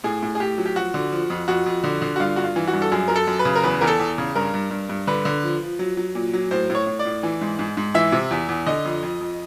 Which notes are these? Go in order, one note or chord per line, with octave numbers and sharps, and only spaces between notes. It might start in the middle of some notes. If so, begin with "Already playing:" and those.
A2 G#4
A2
G#4
A2 G4
F#3
G4
F3 F#4
D3
F3
F2
F2 F#4
F2
D3
D3
F#4
G2 F4
G2 F#4
F4
E3
F#4
G2
A4
F#2 G#4
F#2 A#4
A4
F#2
B4
C#3
A#4
E2 B4
E2 A#4
A4
E2
C#3
G2 A#4
G2
G2
G2
D3 B4
D3
F3
F3
F#3
F#3
A#2
F#3
A2 C5
A2
C#5
A2
D5
A2
E3
G#2
G#2
G#2
E3 E5
C3
E2
E2
D3 D#5
F2
F2
F2